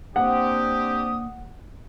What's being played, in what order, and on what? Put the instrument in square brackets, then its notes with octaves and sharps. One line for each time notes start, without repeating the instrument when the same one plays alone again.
[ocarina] A#3 [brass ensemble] C4 D4 G4 [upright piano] F#5 [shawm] D#6